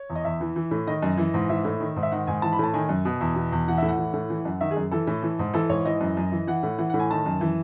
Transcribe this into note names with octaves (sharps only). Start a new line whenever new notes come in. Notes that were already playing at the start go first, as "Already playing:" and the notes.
Already playing: C#5
E2
D#5
E2 E5
E3
E3
A2
D#3 D#5
F#2
E3
G#2
E3 E5
A2
D#3
G#2
E5
D#3 F#5
G#2 G#5
E3 A5
B5
A2 A5
D#3 G#5
F#2
B2
E2
B2
E2
E3 F#5
A2 E5
F#5
E3
A2
E3
F#2
D#3 E5
G#4
F#2
E3 A4
A2
E3
G#2
E3 A4
G#2 C#5
E3 D#5
F#2
F#2
E3
E3 F#5
A2
E3 F#5
A2 F#5
G#5
D#3 A5
F#2
E3